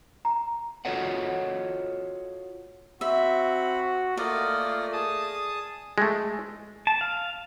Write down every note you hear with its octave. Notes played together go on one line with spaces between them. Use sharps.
A#5
F4 F#4 A4 C#5 D#5 F#5
C4 F#4 E5 B5
A3 A#3 F4 D5 D#5
G#4 A5 D#6
G#3 A3
A5
F5